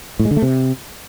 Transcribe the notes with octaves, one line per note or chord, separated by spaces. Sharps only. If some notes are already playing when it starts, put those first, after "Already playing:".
A2
G#3
D3
A3
C3